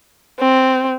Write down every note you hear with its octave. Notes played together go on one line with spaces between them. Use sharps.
C4